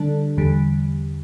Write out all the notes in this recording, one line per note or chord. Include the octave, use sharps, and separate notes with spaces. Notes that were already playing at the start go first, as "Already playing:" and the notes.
Already playing: D3 G3 D4 A4
E2 D3 G3